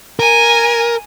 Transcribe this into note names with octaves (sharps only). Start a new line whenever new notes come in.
A#4 G#5